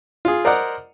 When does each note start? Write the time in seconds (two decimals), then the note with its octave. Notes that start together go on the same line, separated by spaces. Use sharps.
0.25 F4 G#4
0.45 A#4 C5 D5 D#5 F#5 A#5